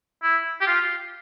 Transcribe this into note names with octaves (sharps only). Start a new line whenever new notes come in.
E4
G4
F4